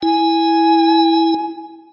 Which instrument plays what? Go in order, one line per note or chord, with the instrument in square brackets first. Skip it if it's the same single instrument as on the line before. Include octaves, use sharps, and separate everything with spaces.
[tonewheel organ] E4 [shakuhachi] G#5